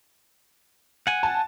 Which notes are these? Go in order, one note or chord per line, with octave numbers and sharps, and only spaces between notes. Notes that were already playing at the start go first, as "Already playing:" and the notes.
F#5 G#5
A5